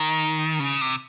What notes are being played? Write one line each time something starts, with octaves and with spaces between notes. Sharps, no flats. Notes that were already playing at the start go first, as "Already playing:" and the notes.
Already playing: D#3
C#3
C3